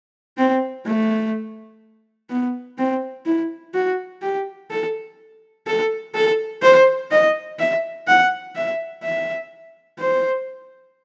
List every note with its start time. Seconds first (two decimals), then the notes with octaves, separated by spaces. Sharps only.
0.38 C4
0.86 A3
2.30 B3
2.78 C4
3.26 E4
3.74 F#4
4.22 G4
4.71 A4
5.67 A4
6.15 A4
6.62 C5
7.11 D#5
7.59 E5
8.07 F#5
8.56 E5
9.04 E5
10.00 C5